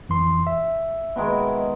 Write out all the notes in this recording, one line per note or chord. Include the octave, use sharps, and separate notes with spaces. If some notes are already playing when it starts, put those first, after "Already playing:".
F2 E3 C6
E5
B2 D#3 G#3